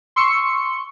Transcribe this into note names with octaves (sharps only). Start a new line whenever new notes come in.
C6 C#6 E6 C#7